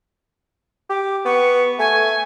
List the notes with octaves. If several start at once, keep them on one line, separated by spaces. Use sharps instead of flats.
G4 D6
B3 C#6
A3 G#5